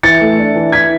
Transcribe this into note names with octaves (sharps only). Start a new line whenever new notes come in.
E3 A6 C#7
A3
D4
E3
E3 G#6 B6